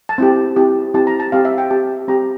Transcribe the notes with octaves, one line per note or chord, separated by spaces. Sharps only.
A5
C4 E4 G4
C4 E4 G4
C4 E4 G4 A5
A#5
A5
C4 G4 F5
E5
G5
C4 G4 A5
C4 G4 A#5